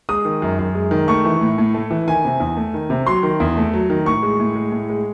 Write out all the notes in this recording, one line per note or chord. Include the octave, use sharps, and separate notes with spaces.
G#3 D#6
D#3
F#2
F#2
G#3
D#3
A3 C#6
E3
A2
A2
A3
E3
D#3 G#5
C3
E2
A3
D#3
C3
F#3 C6
D#3
E2
A3
F#3
D#3
A2 C#6
G#3
A2
G#3
A2
G#3